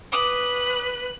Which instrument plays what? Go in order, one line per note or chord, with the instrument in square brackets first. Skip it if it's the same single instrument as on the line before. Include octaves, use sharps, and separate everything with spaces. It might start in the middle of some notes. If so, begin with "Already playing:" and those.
[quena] B4 [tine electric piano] D6 D#6 [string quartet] F#6